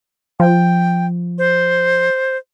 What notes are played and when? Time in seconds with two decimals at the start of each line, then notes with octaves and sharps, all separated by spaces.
0.40 F3 G5
1.38 C5